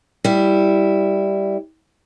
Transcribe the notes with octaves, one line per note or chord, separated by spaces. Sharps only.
G3 E4